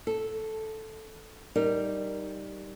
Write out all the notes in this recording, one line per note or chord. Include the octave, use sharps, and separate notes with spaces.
A4
G3 D#4 A#4